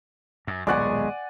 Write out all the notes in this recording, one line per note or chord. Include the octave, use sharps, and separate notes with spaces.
F#2
D#1 B1 G#3 B3 D5 F#5 G#5 C#6